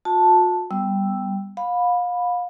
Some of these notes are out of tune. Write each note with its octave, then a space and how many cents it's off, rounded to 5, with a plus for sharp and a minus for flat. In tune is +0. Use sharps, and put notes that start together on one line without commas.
F#4 -45 A5 +0
G3 +0 B3 +0 E6 +0
F5 +30 B5 +0